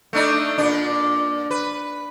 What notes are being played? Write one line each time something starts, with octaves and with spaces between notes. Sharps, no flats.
A3 D4 D#4
A#2 D4
B4